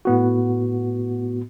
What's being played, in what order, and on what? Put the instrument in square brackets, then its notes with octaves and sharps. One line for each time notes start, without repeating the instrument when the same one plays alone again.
[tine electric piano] A2 B3 F#4